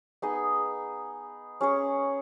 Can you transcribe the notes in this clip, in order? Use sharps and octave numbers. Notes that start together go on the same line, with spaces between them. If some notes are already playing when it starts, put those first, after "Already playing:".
B3 D#4 G#4 D#5
C#4 G#4 C#5